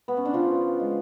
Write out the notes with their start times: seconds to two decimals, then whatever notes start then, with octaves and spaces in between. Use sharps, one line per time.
0.08 B3
0.17 C#4
0.25 D4
0.33 C#3 F3 F4
0.80 G#3